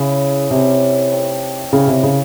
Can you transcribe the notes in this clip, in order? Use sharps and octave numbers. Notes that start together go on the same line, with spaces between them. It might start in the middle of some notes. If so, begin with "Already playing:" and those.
Already playing: C#3 C#4 E4 G#4
C3 C#4 E4 A4
A3 C4 D#4
C#3 E4 G4 A#4 C#5
C3
C#3